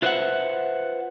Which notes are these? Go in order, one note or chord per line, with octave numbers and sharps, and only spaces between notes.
F4 B4 C5 D#5 E5 F#5